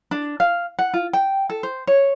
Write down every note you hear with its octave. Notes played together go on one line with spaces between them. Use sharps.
D4
F5
F#5
F4
G5
A4
C5
C#5